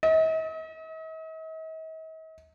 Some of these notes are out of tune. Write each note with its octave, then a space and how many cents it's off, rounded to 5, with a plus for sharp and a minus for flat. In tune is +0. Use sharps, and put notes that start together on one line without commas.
D#5 +45